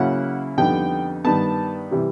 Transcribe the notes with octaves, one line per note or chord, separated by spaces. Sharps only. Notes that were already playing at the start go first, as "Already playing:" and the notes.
Already playing: C#3 F#3 A#3 C#4 E4 F#5
F2 D3 G3 B3 D#4 G5
G2 D#3 G3 B3 A5
C3 E3 G3